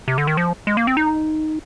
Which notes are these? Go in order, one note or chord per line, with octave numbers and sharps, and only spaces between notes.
C3
D3
D#3
F3
G#3
A#3
C4
D#4